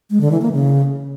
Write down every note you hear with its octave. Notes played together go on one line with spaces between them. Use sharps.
G#3
D3
E3
A#3
C#3